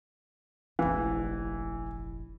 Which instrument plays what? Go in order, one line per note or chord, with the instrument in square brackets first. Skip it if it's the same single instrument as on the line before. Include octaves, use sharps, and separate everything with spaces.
[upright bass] F1 A#1 [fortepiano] E3